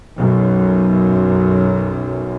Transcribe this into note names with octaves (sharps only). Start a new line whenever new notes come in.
B1 F#2